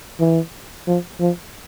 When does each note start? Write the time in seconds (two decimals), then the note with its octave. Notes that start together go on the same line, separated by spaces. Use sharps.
0.20 E3
0.87 F3
1.20 F3